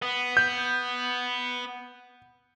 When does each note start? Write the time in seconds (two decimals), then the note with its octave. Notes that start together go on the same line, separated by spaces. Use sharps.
0.02 B3
0.37 G6